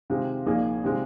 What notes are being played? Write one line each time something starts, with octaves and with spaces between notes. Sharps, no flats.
C3 D#3 G#3 F4
A#1 A#2 A#3 D#4 G#4
C3 D#3 G#3 F4